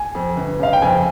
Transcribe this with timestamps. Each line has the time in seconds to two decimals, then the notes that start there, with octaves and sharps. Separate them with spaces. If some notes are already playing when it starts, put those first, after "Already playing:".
Already playing: G#5
0.15 F2
0.37 G1
0.59 C#3 F5
0.73 G5
0.82 F2 G#5